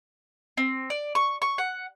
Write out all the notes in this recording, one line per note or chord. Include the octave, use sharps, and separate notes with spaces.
C4
D5
C#6
C#6
F#5